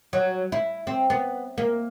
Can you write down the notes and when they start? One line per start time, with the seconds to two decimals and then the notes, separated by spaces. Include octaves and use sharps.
0.13 F#3
0.52 E4
0.87 C4
1.10 B3
1.58 A#3